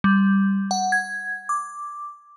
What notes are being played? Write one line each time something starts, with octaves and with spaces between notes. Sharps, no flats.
G3
F#5
G#6
D6